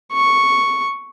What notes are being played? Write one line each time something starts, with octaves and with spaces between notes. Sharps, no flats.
C#6